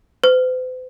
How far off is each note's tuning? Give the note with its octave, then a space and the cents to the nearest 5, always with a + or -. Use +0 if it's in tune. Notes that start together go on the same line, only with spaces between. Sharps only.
C5 -45